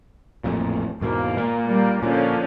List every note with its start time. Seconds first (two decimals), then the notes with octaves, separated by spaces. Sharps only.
0.44 A1 F2 A#2
1.01 E2 G#2 B2 A#3
1.37 A#2
1.68 G3 A#3
2.03 A#2 D3 F3 C#4